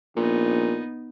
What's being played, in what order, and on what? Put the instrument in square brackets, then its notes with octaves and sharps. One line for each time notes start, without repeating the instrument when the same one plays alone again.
[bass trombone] A#1 [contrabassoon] A#2 [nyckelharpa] B3 D#4